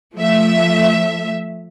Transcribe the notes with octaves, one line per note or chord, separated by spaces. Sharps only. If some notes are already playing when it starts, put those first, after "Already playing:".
F3 A3 E5